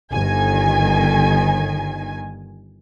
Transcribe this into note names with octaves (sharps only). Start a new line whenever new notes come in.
G1 D#3 G#5